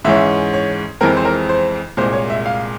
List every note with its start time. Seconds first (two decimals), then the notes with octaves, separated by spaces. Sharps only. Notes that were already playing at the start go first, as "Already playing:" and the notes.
0.05 G#2 E3 G#3 C#4 E5
0.54 C#5
1.01 F2 E3 G#3 C4 A#4
1.17 C5
1.25 A#4
1.49 C5
1.97 C2 A#2 G#3 C5
2.13 C#5
2.30 E5
2.46 F5